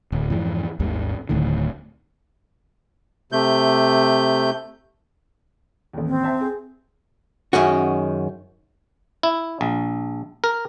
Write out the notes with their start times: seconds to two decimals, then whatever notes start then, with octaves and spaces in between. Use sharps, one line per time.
0.12 D1
0.30 F2 G#2 E3
0.80 G#1 D#2 G#2 G3
1.29 D1 D2 A2 D#3
3.32 C3 A3 G6
5.93 A1 D#2
6.07 C4
6.23 C5 E5 A5
6.41 G#4
7.53 F#2 D#3 G#3 C#4 F#4
9.23 E4
9.61 A#1
10.44 A#4